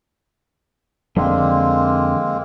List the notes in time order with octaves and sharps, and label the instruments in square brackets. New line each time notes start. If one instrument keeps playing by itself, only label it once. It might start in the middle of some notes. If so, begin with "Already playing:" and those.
[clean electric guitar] F2 [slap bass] D3 [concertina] G#3 A#3 C4